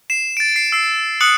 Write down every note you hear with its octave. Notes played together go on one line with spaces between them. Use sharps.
C7 E7
A6 D7
C7
E6 C7
D#6 F#6 C#7 F#7